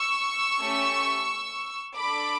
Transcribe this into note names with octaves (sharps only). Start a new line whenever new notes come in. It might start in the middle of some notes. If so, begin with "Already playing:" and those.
Already playing: C#6 E6
A3 C#4 G4
D4 A4 B5 D6